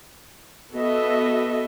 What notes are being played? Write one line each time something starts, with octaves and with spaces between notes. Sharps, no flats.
B3 F#4 A4 D#5 E5